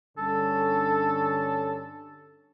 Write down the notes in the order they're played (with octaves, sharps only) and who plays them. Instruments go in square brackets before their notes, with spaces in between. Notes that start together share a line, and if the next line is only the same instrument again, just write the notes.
[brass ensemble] G2 D3 C#4 [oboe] A4